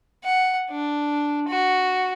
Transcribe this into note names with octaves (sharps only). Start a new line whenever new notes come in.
F#5
D4
F#4